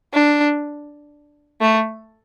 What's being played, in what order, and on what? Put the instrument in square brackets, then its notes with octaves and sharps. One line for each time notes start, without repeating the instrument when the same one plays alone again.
[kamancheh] D4
A3